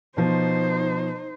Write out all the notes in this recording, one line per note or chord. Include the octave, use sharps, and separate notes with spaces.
B2 F3 D#4 C5